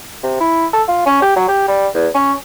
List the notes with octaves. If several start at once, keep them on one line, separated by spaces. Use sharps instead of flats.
C3
E4
A4
F4
C#4
G4
F#3
G4
G3
E2
C#4